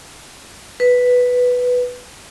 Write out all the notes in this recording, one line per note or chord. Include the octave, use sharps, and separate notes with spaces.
B4